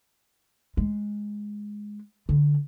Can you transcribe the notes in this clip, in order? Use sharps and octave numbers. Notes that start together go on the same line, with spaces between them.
G#3
D3